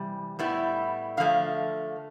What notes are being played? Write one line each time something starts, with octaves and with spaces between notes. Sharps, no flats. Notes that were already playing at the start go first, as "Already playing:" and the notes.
Already playing: C3 E3 G3
A2 G3 B3 E4
D3 F3 A3 F5